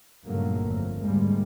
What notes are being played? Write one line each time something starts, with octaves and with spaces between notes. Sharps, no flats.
G2 A#2 C#3 F#3 A3 A#3
G1 F2
D2 G#2 C3 G3 G#3 A#3